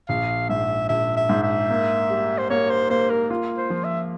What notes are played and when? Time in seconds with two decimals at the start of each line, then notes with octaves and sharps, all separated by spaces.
0.09 A#1 F5
0.49 G#2 E5
0.89 A#1 E5
1.17 E5
1.29 G#2
1.43 E5
1.70 A#3
2.10 G3
2.38 C5
2.50 A#3 C#5
2.70 C5
2.90 A#3 C5
3.10 A#4
3.30 F4
3.58 C5
3.70 F3
3.84 E5